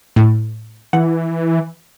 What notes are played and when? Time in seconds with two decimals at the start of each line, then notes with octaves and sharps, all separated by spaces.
0.16 A2
0.93 E3 F#5